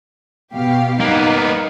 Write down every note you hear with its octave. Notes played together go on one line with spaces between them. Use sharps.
B2 G4 F5
G3 A#3 B3 D#4